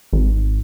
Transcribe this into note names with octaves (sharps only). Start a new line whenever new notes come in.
G#1